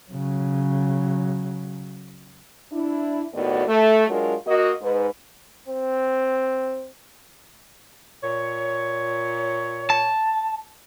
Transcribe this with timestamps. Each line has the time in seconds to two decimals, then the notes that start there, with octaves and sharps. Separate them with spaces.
0.11 C#3 F#3
2.72 D4 E4
3.33 D#2 A2 B3 F#4 D5
3.67 A3
4.08 F#3 G#3 D4 F4 A#4
4.47 A#3 F#4 D#5
4.81 G#2 B4
5.68 C4
8.22 A#2 C#5
9.90 A5